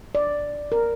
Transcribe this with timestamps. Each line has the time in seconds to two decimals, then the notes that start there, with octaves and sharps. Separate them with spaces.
0.15 D5
0.72 A#4